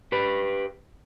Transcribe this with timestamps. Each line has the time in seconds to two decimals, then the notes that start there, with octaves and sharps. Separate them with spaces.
0.12 G4 B4